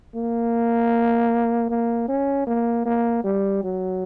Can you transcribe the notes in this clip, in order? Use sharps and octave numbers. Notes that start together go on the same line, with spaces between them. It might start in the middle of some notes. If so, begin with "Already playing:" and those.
A#3
A#3
C#4
A#3
A#3
G3
F#3